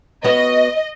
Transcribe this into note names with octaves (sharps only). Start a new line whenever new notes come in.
B3 C#4 F#4 D#5